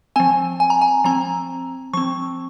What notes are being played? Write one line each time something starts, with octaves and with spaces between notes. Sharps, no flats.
F3 C4 G#5
G#5
A#5
G#5
F3 C4 A#5
F3 C4 C#6